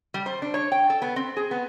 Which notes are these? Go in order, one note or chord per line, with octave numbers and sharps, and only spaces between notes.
G3
C5
D4
C#5
G5
A4
B3
C4
G#4
B3